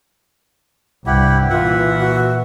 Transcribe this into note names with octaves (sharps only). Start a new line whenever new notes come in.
C2 G2 E4 G4 F#5
A#2 E3 F4 E5 F#5
F#4